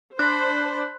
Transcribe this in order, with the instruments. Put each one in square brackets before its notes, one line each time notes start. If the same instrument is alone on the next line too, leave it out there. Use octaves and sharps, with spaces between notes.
[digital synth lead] D4 [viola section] C5 [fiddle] B5 [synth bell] F#6